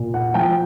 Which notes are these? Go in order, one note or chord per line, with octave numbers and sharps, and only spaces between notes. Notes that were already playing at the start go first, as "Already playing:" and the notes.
Already playing: A#2
F#5
F3 G5